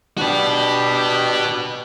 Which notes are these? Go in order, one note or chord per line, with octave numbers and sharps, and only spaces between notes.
D4 F#4 G4 B4